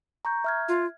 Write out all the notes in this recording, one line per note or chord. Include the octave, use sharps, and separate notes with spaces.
A#5 C#6 G6
E5 F6 G#6
F4